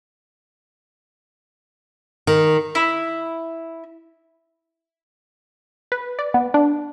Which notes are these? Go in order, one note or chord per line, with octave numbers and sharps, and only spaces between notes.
D#3
E4
B4
D5
B3
D4